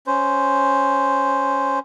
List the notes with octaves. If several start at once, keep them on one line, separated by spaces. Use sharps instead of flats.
C#4 C5